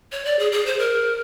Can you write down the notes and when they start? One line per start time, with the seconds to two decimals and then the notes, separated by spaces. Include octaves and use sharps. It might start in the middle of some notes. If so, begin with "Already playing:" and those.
0.12 C#5
0.25 D5
0.39 G#4
0.52 G#4
0.66 C5
0.79 A#4